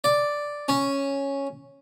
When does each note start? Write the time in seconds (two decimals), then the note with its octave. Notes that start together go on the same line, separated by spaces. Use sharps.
0.04 D5
0.68 C#4